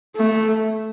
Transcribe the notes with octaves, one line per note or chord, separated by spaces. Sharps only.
A3